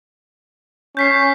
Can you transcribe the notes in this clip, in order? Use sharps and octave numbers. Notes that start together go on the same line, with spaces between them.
C#4 G6 B6 C7